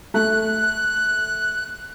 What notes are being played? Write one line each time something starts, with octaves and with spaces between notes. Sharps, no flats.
A3 F#6